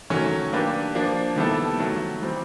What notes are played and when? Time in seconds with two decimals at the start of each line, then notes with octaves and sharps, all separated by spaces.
0.10 D#3 F#3 A3 C#4
0.53 A#3 D4 G4 B4
0.95 F3 A#3 D4
1.36 D#3 G3 B3 E4 A4
1.79 D#3 F#3 A3
2.22 E3 G3 C4